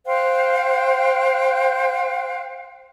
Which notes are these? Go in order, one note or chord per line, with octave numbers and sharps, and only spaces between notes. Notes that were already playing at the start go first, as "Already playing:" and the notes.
C5 F5 G5 F#6